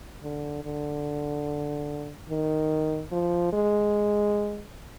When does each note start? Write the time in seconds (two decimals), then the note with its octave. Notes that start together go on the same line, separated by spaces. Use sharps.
0.23 D3
0.64 D3
2.29 D#3
3.12 F3
3.53 G#3